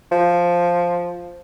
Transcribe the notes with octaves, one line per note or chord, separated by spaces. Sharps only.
F3